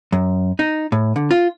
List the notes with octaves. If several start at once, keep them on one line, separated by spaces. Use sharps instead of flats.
F#2
D#4
A2
D3
F4